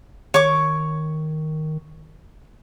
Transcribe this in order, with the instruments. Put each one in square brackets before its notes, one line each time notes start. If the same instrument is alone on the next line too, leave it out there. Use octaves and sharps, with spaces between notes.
[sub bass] D#3 [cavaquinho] C#5 C#6 D6